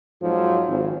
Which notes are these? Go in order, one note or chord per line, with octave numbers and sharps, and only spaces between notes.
F2 G#2 F3 F#3
G#1